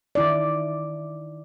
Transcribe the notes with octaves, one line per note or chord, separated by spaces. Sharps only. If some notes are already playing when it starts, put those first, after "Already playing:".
D#3 E4 D5